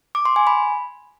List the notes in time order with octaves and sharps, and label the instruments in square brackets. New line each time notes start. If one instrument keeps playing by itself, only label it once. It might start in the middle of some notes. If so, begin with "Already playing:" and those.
[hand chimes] D6
C6
G#5
B5